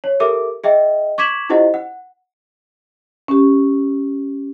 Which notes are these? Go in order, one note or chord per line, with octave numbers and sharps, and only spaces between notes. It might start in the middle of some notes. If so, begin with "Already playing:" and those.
C#5
G4 A4 A#4 E5 D6
G#4 D#5 E5 G5
C#6 D6 G#6 B6 E7 F#7
E4 F4 G4 C5 D#5 F#5
F#5
C#4 G4